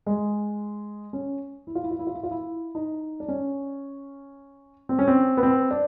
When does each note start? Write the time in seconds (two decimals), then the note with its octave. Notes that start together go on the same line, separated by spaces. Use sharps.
0.06 G#3
1.13 C#4
1.67 E4
1.75 F4
1.84 E4
1.91 F4
1.99 E4
2.07 F4
2.15 E4
2.23 F4
2.31 E4
2.75 D#4
3.20 D4
3.28 C#4
4.89 C4
4.99 C#4
5.08 C4
5.37 B3
5.43 C4
5.71 D4